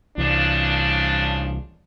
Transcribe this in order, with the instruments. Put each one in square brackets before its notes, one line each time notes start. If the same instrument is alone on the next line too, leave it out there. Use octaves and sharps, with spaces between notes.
[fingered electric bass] C2 E3 [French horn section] C#3 F3 D4